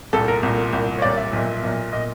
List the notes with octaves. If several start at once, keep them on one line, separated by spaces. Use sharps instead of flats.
C2 A#2 A4
A#4
C2 A#2
C2 A#2
C#5
C2 A#2 D5
E5
B1 A#2
B1 A#2
A#2 D#5